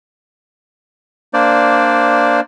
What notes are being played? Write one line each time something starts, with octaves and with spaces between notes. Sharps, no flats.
A#3 D4 C5 D5